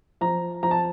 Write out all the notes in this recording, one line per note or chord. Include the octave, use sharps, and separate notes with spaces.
F3 A#5
F3 A#5
A5